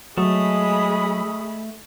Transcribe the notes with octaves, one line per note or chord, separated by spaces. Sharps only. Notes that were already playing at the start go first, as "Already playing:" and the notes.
F#3 G#3 A3 B5 D#6